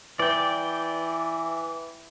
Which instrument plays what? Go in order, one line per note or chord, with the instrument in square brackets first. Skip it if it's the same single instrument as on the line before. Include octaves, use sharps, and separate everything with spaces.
[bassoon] E3 [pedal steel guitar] D5 G5